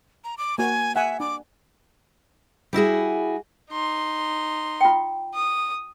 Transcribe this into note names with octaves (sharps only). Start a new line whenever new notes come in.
A#5
D6
A#3 F#4 G#5
E5 F#5 G#5
D4 D6
G3 E4 F#4 G#4
D#4 C6
F4 G5
D#6